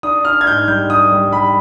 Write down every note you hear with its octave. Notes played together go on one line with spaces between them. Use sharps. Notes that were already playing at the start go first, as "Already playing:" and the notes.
D4 D#6
D4 F6
G#6
G#2 G6
G3 G6
D4 D#6
G3
G3 B5